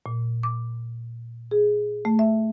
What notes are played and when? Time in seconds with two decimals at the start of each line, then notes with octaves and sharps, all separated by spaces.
0.06 A#2
0.43 D6
1.51 G#4
2.05 A3
2.19 E5